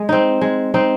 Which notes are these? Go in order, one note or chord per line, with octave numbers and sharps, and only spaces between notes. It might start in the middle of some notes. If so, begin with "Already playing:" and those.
Already playing: G#3
C4 D#4
G#3
C4 D#4